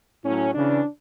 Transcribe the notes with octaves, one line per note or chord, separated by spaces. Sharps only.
A2 F#3 C#4
C#3 E3 D4